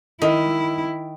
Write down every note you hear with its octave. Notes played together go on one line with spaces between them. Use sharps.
D#3 E4